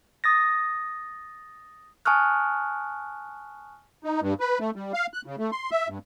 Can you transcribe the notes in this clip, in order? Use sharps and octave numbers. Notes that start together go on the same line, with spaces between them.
D#6 A6 A#6
G#5 A5 C#6 D#6 F6 F#6
D#4
G2
B4
A3
G3
F5
F#6
C#3
A3
C6
E5
G2